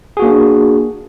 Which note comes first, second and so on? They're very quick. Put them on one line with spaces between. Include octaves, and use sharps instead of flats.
G#4 F#4 A#3 D4